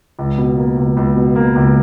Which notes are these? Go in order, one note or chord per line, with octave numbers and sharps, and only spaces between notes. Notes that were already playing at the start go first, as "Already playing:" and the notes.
C#2
B2
A#3
C#2
C#2
B2
A#3
C#2